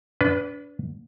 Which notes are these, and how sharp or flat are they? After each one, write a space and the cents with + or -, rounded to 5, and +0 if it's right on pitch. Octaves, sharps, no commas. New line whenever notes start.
D4 -30 B4 +0